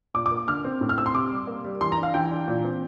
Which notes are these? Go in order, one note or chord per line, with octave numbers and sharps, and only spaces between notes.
A#2 D6
D6
A#3
D3 F6
C4
A2
F6
C4 E6
C6
C3 D6
G3
A#3
G3
E3 C6
A#5
D4
F5
E3 G5
D4
A#2
C4